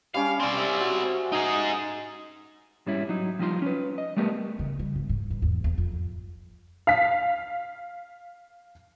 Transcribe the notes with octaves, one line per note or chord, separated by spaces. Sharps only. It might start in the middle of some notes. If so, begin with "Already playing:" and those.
G3 C#4 F5 D6
C4 D5
E5
F#4
D#4 G#4
G#2 G3 C#4 E4
F#3 D#4
F3 G3 D#4 F4 C6
C#4 B4
D#5
G3 A3 B3 G4 A4 A#4
C#3
G3
G#1
G#2
G2
E2
E2
F2
F5 B6